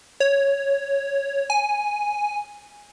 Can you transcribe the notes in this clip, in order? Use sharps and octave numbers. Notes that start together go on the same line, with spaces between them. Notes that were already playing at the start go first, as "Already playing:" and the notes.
C#5
G#5